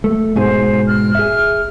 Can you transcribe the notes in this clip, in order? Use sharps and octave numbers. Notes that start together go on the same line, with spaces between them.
A3
G#2 B2 G#4 C5
F6
G#4 E5